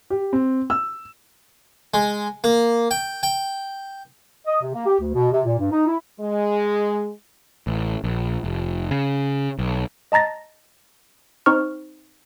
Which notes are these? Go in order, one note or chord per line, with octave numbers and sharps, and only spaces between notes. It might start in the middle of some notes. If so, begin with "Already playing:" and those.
G4
C4
E6
G#3
A#3
G5
G5
D#5
C3
A#3
G4
D2
B2
C3
A#2
G2
D#4
E4
G#3
A1
A#1
F1
C#3
B1
D#5 A5 A#5 A6 A#6
C4 D#4 C5 C#6 F6